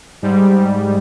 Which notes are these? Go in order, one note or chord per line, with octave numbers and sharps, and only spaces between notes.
G#2 G3